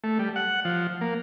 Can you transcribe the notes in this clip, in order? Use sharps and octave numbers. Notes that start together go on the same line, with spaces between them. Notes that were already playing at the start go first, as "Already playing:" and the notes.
A3
G3
F#5
F3
A#3